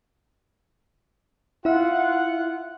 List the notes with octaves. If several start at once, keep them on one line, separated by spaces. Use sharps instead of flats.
E4 F4 E5 F#5